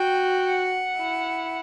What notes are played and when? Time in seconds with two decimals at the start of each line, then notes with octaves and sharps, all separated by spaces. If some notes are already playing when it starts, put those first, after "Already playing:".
Already playing: F#4 G5
0.45 F#5
0.98 E4